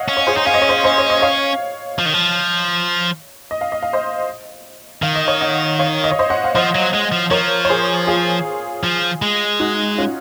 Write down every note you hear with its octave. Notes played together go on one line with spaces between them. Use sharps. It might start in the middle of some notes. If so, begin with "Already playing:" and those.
Already playing: C#5 D#5 F5 F#5
C#4
C#5
G#4 C5
D#4
C#4 F5
D#5
C#5
C5 D#5
C5 D#5
C#5
D#5
C#5 F5
F3
D#3
F3
D#5
F5
D#5
F5
C5 D#5
D#3 F5
D#5
C#5 F5
D#5 F#5
C#5 F5
D#5
C#5
C5 D#5
D#5 F#5
F5
F3 C5 D#5
F#3
G#3
F3
F3 A#4 C#5
C#5
G#4 C5
F4 G#4
F3
G#3
D#4 F#4
C#4 F4